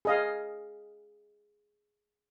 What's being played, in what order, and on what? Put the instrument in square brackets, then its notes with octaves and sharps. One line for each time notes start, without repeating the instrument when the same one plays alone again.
[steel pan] G#4 D#5 F5